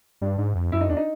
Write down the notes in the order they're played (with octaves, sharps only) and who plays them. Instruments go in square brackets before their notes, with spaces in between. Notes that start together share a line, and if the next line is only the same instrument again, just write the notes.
[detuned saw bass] G2 [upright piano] D4
[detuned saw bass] G#2
F2
[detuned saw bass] F#2 [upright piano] E4
[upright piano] D#4
[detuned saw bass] E2 [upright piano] D4
[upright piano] D#4